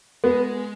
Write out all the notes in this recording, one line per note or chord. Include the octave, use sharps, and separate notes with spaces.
G#3 B3